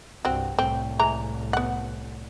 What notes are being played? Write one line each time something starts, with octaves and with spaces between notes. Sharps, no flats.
C2 G2 C4 F#4
C2 A2 C4
E3 G#3 A#5
B3 F#5